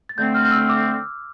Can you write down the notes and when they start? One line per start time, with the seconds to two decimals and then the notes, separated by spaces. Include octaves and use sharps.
0.09 A6
0.18 D3 A3 C4 G6
0.35 F6
0.45 F6
0.51 E6
0.69 D6